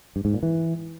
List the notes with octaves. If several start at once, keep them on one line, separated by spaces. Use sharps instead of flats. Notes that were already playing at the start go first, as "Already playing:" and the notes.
G2
G#2
A#2
E3